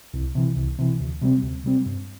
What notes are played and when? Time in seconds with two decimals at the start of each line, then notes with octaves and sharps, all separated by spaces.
0.14 C2
0.35 C3 E3
0.57 C2
0.79 C3 E3
1.00 D2
1.21 C3 G3 C4
1.43 D2
1.64 C3 G3 C4
1.86 G2